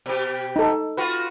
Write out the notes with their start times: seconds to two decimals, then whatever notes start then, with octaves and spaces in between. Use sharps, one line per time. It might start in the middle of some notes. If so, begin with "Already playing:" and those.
0.06 B2 G4
0.56 D#4 A4
0.97 F4 F#4 B4